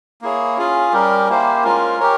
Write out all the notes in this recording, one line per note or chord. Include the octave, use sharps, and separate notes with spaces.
A#3 E4 G#4 C#5
C#4 F4 G#4
G3 C#4 G4 A#4
A#3 E4 G4 C5
G#3 C#4 F4 A#4
G4 A#4 C#5